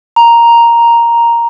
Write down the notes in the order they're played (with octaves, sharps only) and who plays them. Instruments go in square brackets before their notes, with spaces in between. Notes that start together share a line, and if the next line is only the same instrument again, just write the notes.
[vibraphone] A#5